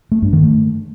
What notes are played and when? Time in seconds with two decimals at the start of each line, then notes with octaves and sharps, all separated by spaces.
0.12 A3
0.22 G2
0.33 D#3
0.43 A3